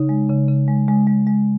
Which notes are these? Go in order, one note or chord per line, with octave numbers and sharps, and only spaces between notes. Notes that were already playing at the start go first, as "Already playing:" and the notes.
Already playing: C#3 D#4
G#3
C#3
C#3
G#3
G#3
G#3
G#3